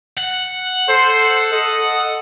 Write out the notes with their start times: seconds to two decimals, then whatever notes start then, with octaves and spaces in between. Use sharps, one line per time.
0.17 F#5
0.89 A4 C5
1.52 A4 D#5